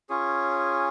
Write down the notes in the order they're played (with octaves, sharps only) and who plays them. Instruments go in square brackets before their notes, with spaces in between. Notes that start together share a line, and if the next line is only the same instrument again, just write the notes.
[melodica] C#4 F4 G#4 C#5